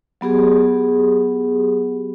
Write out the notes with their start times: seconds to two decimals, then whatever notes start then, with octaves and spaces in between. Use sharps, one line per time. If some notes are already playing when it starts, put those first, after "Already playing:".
0.21 F#3 B3 G4 G#4